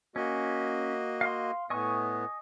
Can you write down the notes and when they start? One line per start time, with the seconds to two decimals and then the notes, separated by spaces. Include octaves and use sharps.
0.16 A#3 C#4 F#4 D#5
1.21 F5 C6
1.70 A2 B3 D#5 G#5 C#6